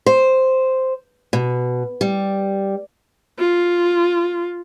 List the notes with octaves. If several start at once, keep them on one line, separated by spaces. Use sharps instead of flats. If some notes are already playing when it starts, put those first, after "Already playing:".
C5
B2
G3
F4